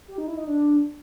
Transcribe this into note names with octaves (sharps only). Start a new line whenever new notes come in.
G4
D#4
E4
D#4
D4